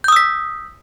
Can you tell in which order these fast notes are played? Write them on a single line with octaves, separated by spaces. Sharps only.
G6 D#6 E6 B6